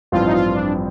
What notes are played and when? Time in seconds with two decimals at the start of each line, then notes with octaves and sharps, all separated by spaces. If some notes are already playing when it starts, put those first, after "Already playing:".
0.12 A1 G2 F3 C4 F4
0.27 D#4
0.34 F4
0.55 D4